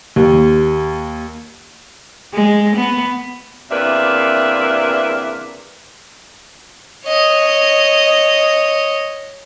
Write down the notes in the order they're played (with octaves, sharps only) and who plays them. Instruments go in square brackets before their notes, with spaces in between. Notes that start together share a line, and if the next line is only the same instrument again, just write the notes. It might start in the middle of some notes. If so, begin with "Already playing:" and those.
[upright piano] D#2
[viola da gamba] G#3
B3
[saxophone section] E2 C3 A#3 D4 B4 E5
[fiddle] C#5 D#5